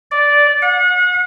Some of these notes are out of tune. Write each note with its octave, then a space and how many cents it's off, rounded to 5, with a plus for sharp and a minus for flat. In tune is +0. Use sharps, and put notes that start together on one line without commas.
D5 -10
F#5 -35